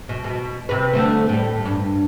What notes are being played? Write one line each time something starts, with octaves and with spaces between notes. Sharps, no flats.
B2
B2
C3 B4
D3 A3 C4
A2 G3
G2